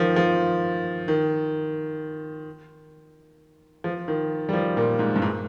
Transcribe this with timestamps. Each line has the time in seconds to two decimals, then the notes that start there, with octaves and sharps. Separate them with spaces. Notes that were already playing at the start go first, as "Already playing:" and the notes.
Already playing: D#3 F3
0.16 F3
1.08 D#3
3.84 F3
4.08 D#3
4.49 G3
4.53 F3
4.77 A#2
4.99 G#2
5.16 G2
5.22 G#2